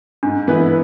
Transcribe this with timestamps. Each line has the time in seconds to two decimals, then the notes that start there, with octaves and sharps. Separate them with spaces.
0.23 G#2 D4
0.47 E3 B3 E4 B4